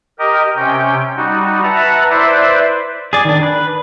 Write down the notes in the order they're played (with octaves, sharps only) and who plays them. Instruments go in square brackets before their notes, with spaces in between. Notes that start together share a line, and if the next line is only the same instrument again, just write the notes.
[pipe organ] G4 A#4 D#5
C3 C#4 G5
G3 D#4 F#4
B4 E5 F#5 A5 A#5
E4 B4 C5 D5 E5
[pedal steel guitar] G#4 D5
D#3 D4
B4